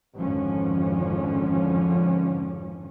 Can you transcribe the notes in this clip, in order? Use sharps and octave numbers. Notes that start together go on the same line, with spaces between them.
G#1 F2 D3 F3 C#4